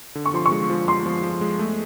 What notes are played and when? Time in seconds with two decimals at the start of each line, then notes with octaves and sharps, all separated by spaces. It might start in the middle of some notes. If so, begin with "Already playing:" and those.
0.15 D3
0.26 C#6
0.34 F3 C6
0.46 C#6
0.52 G#3
0.70 F3
0.88 G#3 C6
1.06 F3
1.23 F3
1.41 G#3
1.59 A3